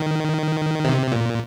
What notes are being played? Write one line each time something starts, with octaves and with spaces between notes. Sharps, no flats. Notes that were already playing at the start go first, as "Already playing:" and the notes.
Already playing: D#3
C3
A#2